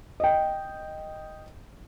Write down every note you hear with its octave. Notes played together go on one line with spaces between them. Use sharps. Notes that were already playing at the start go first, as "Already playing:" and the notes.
D#5 G5